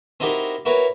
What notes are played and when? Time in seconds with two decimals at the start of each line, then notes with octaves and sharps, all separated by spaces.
0.20 C4 D#4 E4 F#4 G4 A#4
0.65 E4 F#4 A#4 B4 C#5